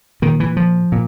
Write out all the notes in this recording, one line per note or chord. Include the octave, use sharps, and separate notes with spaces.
A#2 D#3
E3
F3
A#2